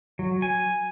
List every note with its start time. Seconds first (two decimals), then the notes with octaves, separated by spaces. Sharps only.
0.19 F#3
0.42 G#5